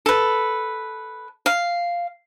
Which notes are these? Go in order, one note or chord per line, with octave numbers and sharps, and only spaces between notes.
A4 B4
F5